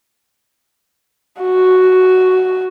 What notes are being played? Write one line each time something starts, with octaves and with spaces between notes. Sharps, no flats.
F#4